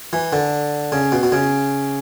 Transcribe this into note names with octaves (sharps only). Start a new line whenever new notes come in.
E3
D3
C#3
B2
B2
C#3